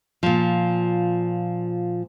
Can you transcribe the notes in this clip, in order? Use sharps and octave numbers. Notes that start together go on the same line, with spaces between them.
A#2 F3